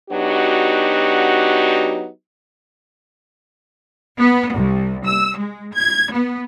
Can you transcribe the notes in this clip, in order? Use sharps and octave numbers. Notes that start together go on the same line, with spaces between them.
F#3 B3 D4 D#4 F#4 G4
B3
C2
E6
G#3
G#6
B3